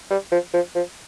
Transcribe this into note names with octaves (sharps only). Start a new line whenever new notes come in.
G3
F3
F3
F3